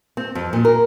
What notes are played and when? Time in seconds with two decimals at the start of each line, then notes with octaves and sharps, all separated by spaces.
0.17 C4
0.35 F2
0.53 A#2
0.65 A#4